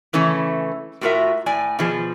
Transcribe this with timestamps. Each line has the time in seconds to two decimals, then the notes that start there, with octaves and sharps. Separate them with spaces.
0.13 C#3 E3 A3 C#4
1.01 A2 F4 F#4 A4 A#4 E5
1.46 A2 D5 G#5
1.79 B2 F3 G#4